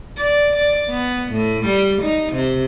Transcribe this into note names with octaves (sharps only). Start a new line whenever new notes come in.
D5
D5
B3
A2
G3
D#4
C3